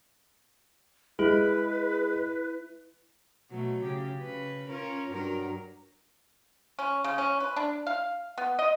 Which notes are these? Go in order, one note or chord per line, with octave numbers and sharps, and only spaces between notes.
G#3 E4 B4
B2 F#3 A3
C#3 G4
C#3 B4
C#4 F4 A#4
G2 F#3 A#4
C#4
C#3
C#4
B4
D4
F5
B3
D#5